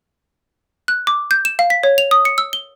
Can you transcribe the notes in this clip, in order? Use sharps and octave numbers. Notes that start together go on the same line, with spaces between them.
F#6
D6
G6
E7
F5
B6
C#5
F7
D#6
C#7
E6
G7